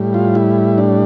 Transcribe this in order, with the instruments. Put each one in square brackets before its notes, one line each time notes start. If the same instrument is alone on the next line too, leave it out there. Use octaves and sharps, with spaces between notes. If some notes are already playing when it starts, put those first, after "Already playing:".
Already playing: [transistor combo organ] A2 G3
F4
E4
D4